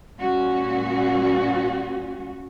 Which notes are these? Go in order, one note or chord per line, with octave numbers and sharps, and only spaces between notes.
A#2 G3 C#4 F#4